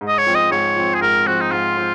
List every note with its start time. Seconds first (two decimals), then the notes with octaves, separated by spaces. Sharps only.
0.01 G#2
0.08 D#5
0.18 C#5
0.27 F3 C4
0.35 D#5
0.51 G#2 C#5
0.76 F3 C4
0.94 G#4
1.01 G#2 A#4
1.26 F3 C4 F#4
1.41 D#4
1.51 G#2 F4
1.77 F3 C4